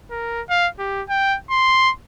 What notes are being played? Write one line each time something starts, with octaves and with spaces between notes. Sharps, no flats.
A#4
F5
G4
G5
C6